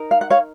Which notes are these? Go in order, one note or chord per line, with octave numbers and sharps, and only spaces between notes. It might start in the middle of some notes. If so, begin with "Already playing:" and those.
Already playing: D#4 A#4
F5
F#5
C#5 F5